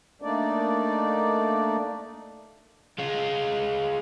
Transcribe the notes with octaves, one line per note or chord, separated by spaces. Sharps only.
A3 A#3 D4 D#4 D5
G#3 F4